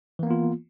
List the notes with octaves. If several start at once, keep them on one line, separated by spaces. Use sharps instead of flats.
E3 A#3 B3 F4